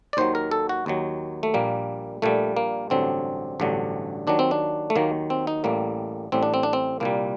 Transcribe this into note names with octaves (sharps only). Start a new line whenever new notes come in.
D5
D#2 D#3 F#3 C5
A#4
A4
F#4
D#2 D#3 F#3
A3
A#1 A#2 G3 A#3
A#1 A#2 G3 A3
A#3
A1 G2 D3 F#3 C4
A1 G2 D3 F#3
D#2 D#3 F#3 D4
C4
D4
A3
D#2 D#3 F#3 A#3
C4
D#4
A1 A2 G3 A#3
A1 A2 G3 C4
D4
C4
D4
C4
C2 A#2 G3 A#3